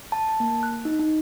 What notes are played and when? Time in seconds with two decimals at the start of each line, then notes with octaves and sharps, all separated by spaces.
0.12 A5
0.29 A5
0.40 A#3
0.63 F#6
0.85 D#4
0.99 D#4